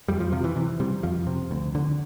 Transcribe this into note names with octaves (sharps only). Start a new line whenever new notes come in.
F2 G3
F3
C3 F3
E3
C3 E3
C3 G3
F2 F3
C3
D2
D3